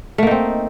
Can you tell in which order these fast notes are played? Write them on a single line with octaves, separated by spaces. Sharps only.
A3 A#3 D#4 C4